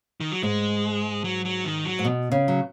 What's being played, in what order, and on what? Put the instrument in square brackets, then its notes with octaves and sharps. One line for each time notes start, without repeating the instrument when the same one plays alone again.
[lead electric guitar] D#3
F#3
[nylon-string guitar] G#2 [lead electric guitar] G#3
[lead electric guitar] F#3
F#3
D#3
F#3
[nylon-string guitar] G#2
B2
C#3
F#3